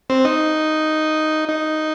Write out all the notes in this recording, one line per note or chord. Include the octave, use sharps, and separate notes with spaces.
C4
D#4
D#4